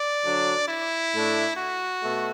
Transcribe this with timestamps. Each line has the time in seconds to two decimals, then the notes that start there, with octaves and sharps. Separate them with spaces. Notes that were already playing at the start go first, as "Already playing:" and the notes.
Already playing: D5
0.23 D3 F#3 D4
0.67 E4
1.12 A2 A3 D4
1.56 F#4
2.02 B2 A3